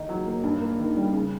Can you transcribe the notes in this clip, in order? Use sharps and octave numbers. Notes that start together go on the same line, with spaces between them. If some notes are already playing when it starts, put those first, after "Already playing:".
Already playing: D#3 D#4
F#3
A#3
G2
A#3
D#3
G3
C#3